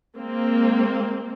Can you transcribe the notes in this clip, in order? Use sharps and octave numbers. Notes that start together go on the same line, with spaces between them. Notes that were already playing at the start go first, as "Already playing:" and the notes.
G#3 A#3 C4